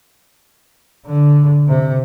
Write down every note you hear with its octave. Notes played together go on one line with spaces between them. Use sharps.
D3
C3